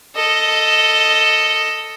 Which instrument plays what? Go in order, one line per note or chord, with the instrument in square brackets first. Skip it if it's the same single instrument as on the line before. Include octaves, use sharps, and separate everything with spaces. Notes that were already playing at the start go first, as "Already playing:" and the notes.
[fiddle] A4 D#5